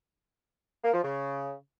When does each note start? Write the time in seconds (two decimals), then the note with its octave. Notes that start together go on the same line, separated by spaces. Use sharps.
0.83 A#3
0.93 F3
1.03 C#3